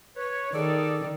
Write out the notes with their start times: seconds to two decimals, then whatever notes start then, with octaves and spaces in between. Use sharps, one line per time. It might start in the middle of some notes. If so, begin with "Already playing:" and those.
0.16 B4 C#5
0.54 D#3 G#4 A4 D5